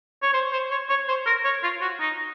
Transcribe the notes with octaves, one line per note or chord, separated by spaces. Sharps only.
C#5
C5
C5
C#5
C#5
C5
A#4
C#5
F4
F#4
D#4